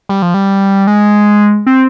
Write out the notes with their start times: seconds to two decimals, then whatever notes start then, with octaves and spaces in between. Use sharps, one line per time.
0.09 G3
0.22 F3
0.34 G3
0.87 G#3
1.67 C4